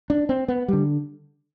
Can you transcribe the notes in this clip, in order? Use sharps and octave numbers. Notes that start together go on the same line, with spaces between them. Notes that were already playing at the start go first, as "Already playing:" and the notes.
D4
C4
B3
D3 G3